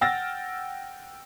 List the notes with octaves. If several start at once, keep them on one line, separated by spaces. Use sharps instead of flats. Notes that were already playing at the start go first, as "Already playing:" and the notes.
F#5 G5 E6 F6 A6 A#6